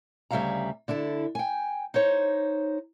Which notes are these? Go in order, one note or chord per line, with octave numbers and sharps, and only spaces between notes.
D2 C#3 G3 E5 F5 A#5
D3 D4 E4 A4
G5 G#5
D#4 C5 C#5